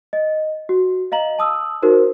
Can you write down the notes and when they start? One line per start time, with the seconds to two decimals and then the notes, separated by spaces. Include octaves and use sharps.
0.13 D#5
0.69 F#4
1.12 D#5 F5 A#5 F#7
1.39 A5 D#6 E6
1.82 D#4 F#4 A#4 C5